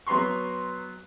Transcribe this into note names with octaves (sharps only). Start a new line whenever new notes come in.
F#3 B3 A#5 C6 C#6